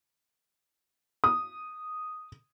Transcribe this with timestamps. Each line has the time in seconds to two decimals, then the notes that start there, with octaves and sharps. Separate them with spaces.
1.24 D#6